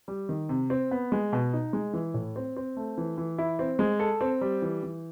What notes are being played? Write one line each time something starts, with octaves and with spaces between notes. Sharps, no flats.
G3
D#3
C3
C4
B3
G#3
B2
D#4
G#3
E3
A2
C4
C4
A3
E3
E3
E4
C4
G#3
A4
C4
G3
E3
E3